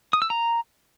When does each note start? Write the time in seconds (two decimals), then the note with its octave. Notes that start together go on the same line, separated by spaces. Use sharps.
0.13 D#6
0.22 E6
0.30 A#5